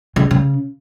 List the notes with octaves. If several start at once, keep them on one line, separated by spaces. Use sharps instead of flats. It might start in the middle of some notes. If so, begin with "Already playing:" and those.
C#3
C#3